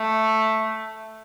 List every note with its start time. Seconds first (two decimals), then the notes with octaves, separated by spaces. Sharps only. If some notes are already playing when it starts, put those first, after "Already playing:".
Already playing: A3